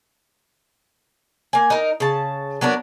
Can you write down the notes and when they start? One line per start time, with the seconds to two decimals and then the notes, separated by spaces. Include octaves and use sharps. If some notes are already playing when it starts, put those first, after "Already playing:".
1.53 A#3 G#5
1.70 D#4 A#4
2.00 C#3 A5
2.61 F#3 B3 D4 A#4